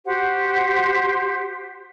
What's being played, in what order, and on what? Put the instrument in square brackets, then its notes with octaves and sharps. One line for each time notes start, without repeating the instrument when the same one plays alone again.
[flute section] F#4 G4 C5 F#5